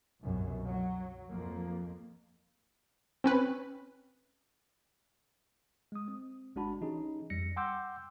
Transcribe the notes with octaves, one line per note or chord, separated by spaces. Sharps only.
C2 F#2 B2
F#3
F2 F3 A#3
C4 C#4 B4
G#3 D#6
C4
G1 G#3 D4 F#4 A5 B5
E3 C#4 D#4 G4 G#4
F2 G3 A#6 C#7
F#5 G5 C6 D6 E6 G6